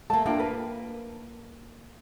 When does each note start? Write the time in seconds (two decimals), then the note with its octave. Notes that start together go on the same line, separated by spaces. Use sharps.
0.10 A3 A#3 A5
0.26 A#3 D4 F4 G5
0.38 A#4 B4